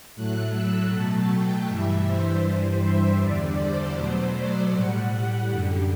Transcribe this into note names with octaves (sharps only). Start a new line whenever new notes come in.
A2 F#3 A3 F#6
E6
B2 F#3 A3 A5
G5
G2 E3 G3 E5
C5
G2 E3 G3 C5
E5
E2 D3 G3 D5
C5
B2 F#3 A3 C5
D5
A2 G3 F#5
F#2 D3 G3